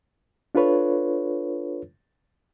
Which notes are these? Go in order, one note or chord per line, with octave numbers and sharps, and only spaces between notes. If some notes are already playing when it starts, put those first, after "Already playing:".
D4 F4 A4 B4 C#5